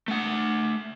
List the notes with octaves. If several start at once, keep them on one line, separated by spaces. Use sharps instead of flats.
A3 F#5